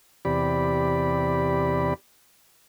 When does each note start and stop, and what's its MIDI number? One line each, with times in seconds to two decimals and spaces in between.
0.25 1.94 40
0.25 1.94 48
0.25 1.94 67
0.25 1.94 74
0.25 1.94 83